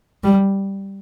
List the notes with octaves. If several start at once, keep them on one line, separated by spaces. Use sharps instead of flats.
G3